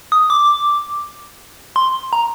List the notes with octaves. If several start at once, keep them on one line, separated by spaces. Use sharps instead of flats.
D#6
D6
C6
A#5